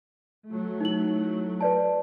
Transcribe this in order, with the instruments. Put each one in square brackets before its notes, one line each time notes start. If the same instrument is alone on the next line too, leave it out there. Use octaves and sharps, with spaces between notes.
[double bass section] F#3 A3
[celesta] D#4 E4 F#7
B4 D5 A5